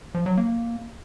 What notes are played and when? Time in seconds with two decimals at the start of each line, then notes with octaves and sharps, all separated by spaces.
0.15 F3
0.26 F#3
0.37 A#3